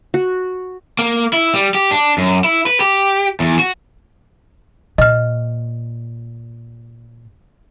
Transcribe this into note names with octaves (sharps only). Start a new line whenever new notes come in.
F#4
A#3
E4
G3
G4
D4
F#2
E4
B4
G4
E2
F#4
A#2 D#5 F6